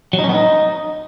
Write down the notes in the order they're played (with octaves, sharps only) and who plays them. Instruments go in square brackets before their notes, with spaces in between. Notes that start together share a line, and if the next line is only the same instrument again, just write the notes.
[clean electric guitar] F#3
D#4
C#4
B3
D#4